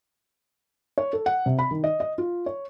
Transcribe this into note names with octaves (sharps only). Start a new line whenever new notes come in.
C#5
A4
F#5
C3
B5
D#3
D#5
D#5
F4
C#5